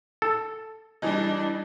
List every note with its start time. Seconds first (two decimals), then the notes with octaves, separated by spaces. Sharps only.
0.22 A4
1.02 E3 G3 D4 D#4